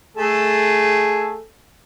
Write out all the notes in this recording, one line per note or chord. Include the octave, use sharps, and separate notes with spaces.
A3 G#4 A4